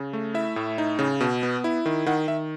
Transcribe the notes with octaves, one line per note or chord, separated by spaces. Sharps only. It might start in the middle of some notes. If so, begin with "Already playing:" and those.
Already playing: C#3
A3
E4 E5
A2
D#4
C#3
B2
B3
E4
D#3
D#3 F#5
D#3 E5